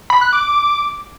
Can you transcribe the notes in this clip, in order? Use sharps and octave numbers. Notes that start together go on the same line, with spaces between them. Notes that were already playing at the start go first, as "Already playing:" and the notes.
B5
F#6
D6